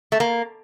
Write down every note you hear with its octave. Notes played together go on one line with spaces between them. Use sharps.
A3
A#3